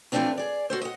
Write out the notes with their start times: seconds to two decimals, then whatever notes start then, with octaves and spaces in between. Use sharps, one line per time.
0.12 E3 F3 A3 C4 D4 F4
0.37 G#4 D5
0.70 F#4 A4 C5
0.81 D#5 F#5